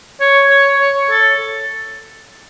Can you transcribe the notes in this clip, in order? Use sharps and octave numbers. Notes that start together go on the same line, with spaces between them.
C#5
C#5
C#5
A4